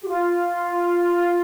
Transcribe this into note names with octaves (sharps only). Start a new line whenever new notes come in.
G4
F4